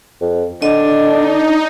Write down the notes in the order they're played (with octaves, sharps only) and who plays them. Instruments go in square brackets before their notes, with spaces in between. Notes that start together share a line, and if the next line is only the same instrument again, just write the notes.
[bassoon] F2
[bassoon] D3 [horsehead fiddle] D4 [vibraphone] D#5
[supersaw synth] D#4